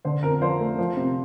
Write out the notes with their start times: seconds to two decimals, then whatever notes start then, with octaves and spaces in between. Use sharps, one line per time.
0.05 D3 C5
0.23 F2 A#4
0.41 F3 C5
0.60 A3
0.78 F3
0.97 C3